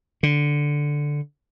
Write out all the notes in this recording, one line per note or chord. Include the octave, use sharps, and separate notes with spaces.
D3